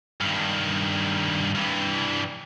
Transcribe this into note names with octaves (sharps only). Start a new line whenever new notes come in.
G2 D#3
G2 E3